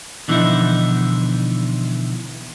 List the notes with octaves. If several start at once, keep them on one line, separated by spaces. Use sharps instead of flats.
B2 D3 E3 F3 D#4 E4